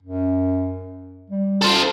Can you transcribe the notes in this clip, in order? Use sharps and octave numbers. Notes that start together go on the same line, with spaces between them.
F#2
G3
A4 C5